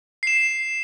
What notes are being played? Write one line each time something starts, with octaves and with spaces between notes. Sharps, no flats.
C7 E7